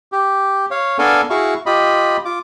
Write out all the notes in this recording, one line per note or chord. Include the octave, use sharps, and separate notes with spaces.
G4
C#5 F5
B3 D4 A4 A#4 F5 G#5
E4 F#4 G#4 F5 C#6
F4 G4 D#5 B5
F4 D6